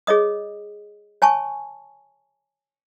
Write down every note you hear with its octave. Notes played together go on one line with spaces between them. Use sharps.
G#4 C#5 D#5 D#6
C#5 G#5 A5 C#6